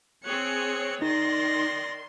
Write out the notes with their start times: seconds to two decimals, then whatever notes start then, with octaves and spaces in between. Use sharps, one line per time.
0.24 C4 G#4 C#5 F#6 C#7
1.02 D#3 D#4 D5 C6 A#6